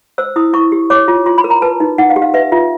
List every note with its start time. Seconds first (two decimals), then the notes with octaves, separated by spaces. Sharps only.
0.18 C5 E6
0.36 E4 D#6
0.54 E4 C#6
0.72 G4
0.90 C#5 D6
1.08 F4
1.26 F4 C6
1.38 B5
1.44 A#4
1.50 A#5
1.62 B4 A5
1.80 D#4
1.98 D#4 F#5
2.10 F5
2.16 G4
2.22 F5
2.34 B4 E5
2.52 F4 E5